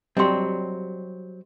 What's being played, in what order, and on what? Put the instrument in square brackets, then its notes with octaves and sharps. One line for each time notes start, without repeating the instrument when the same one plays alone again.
[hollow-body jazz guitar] F#3 C4 [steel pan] G3 [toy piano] D#5 C6